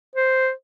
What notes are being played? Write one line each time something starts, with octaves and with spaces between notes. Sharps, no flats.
C5